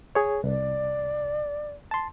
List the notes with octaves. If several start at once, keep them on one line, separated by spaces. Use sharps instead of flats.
G#4 C#5
C2 D5
A5 C6